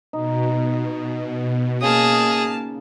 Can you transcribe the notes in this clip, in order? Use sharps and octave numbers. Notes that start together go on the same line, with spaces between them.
B2 D#4
C#3 A#3 G#4 A5 D#6 F6